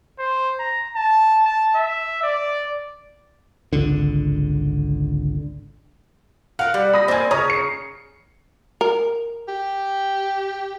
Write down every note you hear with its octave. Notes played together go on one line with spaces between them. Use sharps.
C5
A#5
A5
A5
E5
D5
G#1 C#2 D3
A#4 F5 F#5
G3
B5 D#6 A#6
A#3 C4 D5 G#5
C#3 C#5 A#5 D#6
C7 C#7
A#4
G4